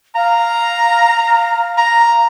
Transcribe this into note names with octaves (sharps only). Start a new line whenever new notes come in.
F5 A#5
A#5